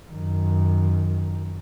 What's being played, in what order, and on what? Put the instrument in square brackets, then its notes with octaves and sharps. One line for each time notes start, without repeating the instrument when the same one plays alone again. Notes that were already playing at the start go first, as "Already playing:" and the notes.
[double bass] F#2 D#3